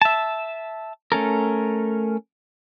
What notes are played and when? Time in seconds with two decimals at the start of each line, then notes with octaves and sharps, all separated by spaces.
0.02 E5 A5
1.12 A3 C#4 A4 A#4